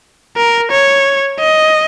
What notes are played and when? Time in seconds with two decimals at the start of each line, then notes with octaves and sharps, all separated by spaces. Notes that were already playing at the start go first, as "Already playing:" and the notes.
0.37 A#4
0.71 C#5
1.40 D#5